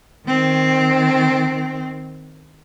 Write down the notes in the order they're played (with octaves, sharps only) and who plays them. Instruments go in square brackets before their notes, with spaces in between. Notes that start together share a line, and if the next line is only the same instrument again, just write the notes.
[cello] D#3 C4